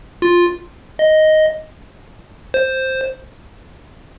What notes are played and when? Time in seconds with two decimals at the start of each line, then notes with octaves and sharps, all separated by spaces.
0.22 F4
0.99 D#5
2.54 C5